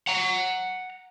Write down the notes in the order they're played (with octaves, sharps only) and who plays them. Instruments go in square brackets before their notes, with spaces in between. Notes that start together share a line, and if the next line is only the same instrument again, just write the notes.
[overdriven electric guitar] F#5 A#5